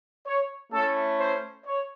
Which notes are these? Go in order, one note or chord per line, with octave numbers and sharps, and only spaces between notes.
C#5
A3 C#4 E4 A4
C5
C#5